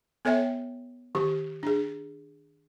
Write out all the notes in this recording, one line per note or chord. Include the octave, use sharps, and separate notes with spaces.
B3 A4 C#5 E5 G5
D#3 G4
D4 G#4